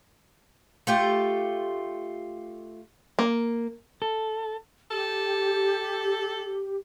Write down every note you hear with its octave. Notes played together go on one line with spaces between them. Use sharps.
A3 F4 G4
A#3
A4
G4 A4